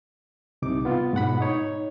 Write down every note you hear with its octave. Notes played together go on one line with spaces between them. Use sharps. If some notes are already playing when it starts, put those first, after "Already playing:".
C2 C3 D#4 D6
B3 F4
G#2 B2 F#5 B5
D#4 C#5